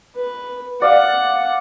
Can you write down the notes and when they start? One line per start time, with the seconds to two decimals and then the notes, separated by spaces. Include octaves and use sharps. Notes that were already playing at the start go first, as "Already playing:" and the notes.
0.16 B4
0.82 D5 F5 F#5